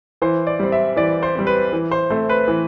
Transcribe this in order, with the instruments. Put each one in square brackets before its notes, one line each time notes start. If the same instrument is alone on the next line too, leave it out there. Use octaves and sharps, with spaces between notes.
[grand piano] E3 C5
D5
G3 C4
E5
E3 D5
C5
G3 C4
B4
E3
C5
A3 C4 C5
B4
E3